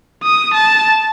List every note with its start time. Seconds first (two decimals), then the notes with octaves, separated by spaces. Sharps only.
0.23 D#6
0.54 A5